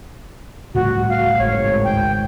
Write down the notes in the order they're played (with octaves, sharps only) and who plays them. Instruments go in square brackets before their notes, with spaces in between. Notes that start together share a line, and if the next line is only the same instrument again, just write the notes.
[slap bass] C#2 A2 G3 [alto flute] F#4
[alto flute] F5
[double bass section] G#1 [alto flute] C#5
[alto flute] G5